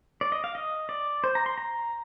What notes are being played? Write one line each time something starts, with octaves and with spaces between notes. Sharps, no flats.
D5
D#5
F5
D#5
D5
C5
A#5
C6
A#5